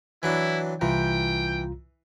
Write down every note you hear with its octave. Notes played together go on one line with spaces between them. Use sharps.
E3 F#3 D4 E4
C2 E3 F4 G5 A#5